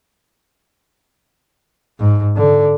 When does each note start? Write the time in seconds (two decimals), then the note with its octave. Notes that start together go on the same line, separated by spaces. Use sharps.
1.99 G#2
2.37 D3